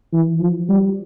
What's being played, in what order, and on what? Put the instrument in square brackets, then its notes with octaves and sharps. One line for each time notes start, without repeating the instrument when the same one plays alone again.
[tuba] E3
F3
G3